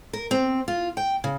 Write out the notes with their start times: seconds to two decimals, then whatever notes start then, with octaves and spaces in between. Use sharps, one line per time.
0.13 A#4
0.31 C4
0.68 F4
0.97 G5
1.24 C#3